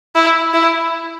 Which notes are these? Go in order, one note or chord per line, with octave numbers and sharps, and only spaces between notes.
E4
E4